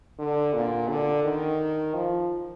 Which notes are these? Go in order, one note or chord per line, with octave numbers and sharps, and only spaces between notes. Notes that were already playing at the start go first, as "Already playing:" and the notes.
D3
A#2
D3
D#3
F3